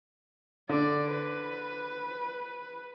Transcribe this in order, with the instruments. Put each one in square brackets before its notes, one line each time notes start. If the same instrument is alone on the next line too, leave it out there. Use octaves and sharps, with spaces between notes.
[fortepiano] D3 [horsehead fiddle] D5
[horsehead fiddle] B4